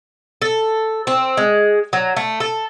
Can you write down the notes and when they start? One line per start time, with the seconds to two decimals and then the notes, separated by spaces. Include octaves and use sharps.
0.42 A4
1.07 C4
1.37 G#3
1.93 F#3
2.16 A3
2.40 A4